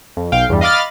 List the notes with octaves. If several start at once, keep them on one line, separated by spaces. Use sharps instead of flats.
F2
B1 F5 G5
E2 G2 G3
D#5 F5 B5 D6 F6 A6